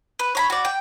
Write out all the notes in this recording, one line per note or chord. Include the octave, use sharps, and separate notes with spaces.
B4
C#5 A#5 B5
F#4 D5
G5